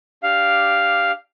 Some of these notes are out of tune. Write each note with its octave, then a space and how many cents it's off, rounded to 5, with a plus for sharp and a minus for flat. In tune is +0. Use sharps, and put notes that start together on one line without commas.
D4 +0 G4 +0 F5 +0